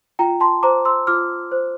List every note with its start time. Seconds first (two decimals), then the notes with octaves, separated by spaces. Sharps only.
0.19 F4 G5 A#5
0.40 A5 C6
0.63 C5 A#5 D6
0.85 C6 E6
1.07 F4 D6 F6
1.52 C5